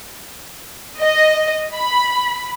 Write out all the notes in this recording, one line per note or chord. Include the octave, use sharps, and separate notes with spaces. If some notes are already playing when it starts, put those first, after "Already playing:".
D#5
B5